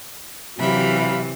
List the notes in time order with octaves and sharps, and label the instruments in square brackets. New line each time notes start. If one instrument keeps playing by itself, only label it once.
[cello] C3 E3 [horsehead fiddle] F#3 F5 [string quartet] G4 E5 B5